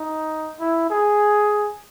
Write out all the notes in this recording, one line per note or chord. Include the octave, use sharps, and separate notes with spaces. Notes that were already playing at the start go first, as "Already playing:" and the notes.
Already playing: D#4
E4
G#4